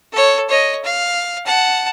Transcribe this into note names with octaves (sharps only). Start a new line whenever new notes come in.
A4 C#5
C#5 D#5
F5
F#5 A5